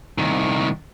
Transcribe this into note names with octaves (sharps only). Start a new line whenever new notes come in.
C2 D#3